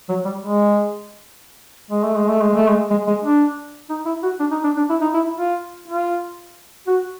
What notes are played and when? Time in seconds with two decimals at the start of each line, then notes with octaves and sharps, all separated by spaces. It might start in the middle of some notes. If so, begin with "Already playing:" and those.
0.09 F#3
0.25 G3
0.42 G#3
1.91 G#3
2.04 A3
2.17 G#3
2.29 A3
2.42 G#3
2.55 A3
2.68 G#3
2.90 G#3
3.07 G#3
3.24 D4
3.89 D#4
4.05 E4
4.23 F#4
4.40 D4
4.51 D#4
4.64 D4
4.77 D4
4.89 E4
5.01 D#4
5.14 E4
5.38 F4
5.88 F4
6.87 F#4